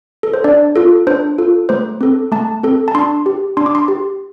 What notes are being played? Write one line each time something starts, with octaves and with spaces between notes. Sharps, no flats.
A4
C5
D4 D5
F4 A4
D4 C5
F4 A4
A3 C5
C4 A4
A3 A5
C4 A4
A5
D4 C6
G4
D4 C6
D6
C6
G4